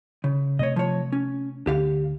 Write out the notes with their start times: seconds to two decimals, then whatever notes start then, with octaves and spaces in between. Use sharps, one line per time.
0.24 C#3
0.59 C3 A3 C#5 D#5
0.76 F3 C#5
1.12 C#4
1.67 D2 D3 G4 F5